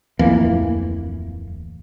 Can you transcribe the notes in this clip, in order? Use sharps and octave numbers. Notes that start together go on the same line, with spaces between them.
D1 F2 E3 A#3